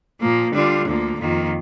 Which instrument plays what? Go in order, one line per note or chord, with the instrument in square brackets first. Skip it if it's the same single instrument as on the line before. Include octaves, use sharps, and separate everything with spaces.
[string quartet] A#2 F3 A#3
D3 G3 D4 F4
D2 D3 F3 A#3
F2 D#3 A#3 F4